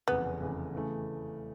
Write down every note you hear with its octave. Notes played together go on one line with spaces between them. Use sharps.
F1 E2 C#3 B3
F1 E2 C#3
C#3 E3 A3